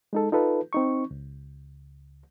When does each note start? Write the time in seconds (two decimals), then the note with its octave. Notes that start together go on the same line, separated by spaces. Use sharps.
0.13 G#3 D#4 A4
0.32 D#4 F4 A4 B4
0.73 C4 D#4 C#6
1.11 C#2